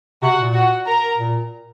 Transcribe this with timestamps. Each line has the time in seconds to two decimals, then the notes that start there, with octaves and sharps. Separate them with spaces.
0.22 C3 F#4 F#5
0.38 A#2
0.54 F#4 F#5
0.86 A#4 A#5
1.17 A#2